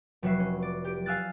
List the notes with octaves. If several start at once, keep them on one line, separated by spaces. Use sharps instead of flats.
F1 F#3 F#4 B4 E5 C7
C#4
D5
G4 D7
F5 G#5 E6 F#6 A6